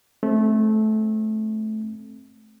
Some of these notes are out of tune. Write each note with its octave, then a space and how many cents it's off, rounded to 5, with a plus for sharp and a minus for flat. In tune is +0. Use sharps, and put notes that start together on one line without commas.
A3 -20 C4 +15